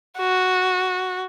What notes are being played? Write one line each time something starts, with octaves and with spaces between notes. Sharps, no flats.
F#4